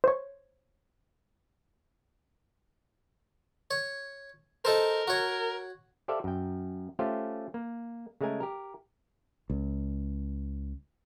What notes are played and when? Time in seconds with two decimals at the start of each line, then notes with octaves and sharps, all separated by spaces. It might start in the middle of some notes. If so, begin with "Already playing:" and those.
0.04 C5 C#5
3.71 C#5
4.65 D#4 A4 A#4 C5
5.08 F#4 C#5
6.08 G4 A4 C5 D5 E5 F5
6.24 F#2 G5
6.99 A3 C#4 F4 G4 C5 F5
7.54 A#3
8.21 C#3 G#3 A3 A#4 G#5
8.40 G4 A#4
9.50 C#2